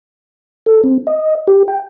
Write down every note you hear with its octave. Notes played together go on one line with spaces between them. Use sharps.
A4
C4
D#5
G4
G5